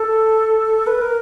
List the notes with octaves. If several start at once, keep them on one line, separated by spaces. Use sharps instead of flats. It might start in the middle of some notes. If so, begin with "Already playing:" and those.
Already playing: A4
B4
A#4